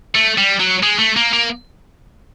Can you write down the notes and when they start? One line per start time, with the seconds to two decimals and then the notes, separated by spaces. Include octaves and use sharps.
0.15 A3
0.38 G3
0.60 F#3
0.83 G#3
0.99 A3
1.17 A#3
1.33 A#3